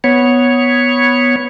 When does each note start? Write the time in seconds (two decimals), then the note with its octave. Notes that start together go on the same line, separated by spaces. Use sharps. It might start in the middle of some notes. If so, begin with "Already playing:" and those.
0.04 B3 C#5